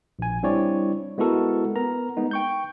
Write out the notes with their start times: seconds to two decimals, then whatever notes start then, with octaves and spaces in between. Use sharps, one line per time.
0.19 A#1 G#5
0.43 G3 C4 D4 E4 C#5 D5
1.18 G#3 B3 E4 F#4 A4 A#4
1.76 B3 A#4 A#5
2.17 G#3 B3 D#4
2.31 G5 C#6 G6